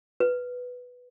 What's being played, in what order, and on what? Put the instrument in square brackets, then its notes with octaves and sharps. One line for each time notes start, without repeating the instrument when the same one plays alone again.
[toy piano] B4